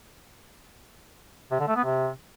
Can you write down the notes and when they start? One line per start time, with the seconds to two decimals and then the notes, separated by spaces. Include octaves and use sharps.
1.52 C3
1.60 D3
1.68 A3
1.76 B3
1.84 C3